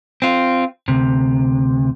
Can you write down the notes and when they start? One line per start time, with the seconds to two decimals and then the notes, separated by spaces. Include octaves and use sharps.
0.22 C4 F4
0.88 D2 C3